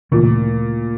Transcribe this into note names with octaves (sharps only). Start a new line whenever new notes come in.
D2 A#2 C#3 E3 A3